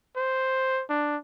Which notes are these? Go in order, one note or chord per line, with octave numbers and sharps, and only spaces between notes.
C5
D4